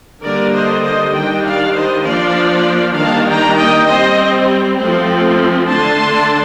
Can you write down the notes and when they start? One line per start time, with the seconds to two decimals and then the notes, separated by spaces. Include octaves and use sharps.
0.22 D3 G3 A#3 D4 A#4 D5
0.53 C5 D#5
0.83 C5 D#5
1.13 D#3 G3 D4 D#5 G5
1.44 D5 F5
1.73 C5 D#5
2.04 F3 A#3 D4 D5 F5
2.95 D#3 G3 A#3 D4 F5 A5
3.26 G5 A#5
3.56 D#5 G5
3.86 G3 C4 C5 D#5
4.77 F3 A3 C4
5.68 D3 A3 D4 A5 C6